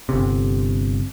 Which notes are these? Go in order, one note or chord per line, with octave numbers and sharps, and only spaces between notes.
G1 C3